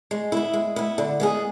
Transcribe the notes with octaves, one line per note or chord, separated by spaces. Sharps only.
G#3
B3 E4
G#3
B3 E4
D3
G#3 B3 E4 G#4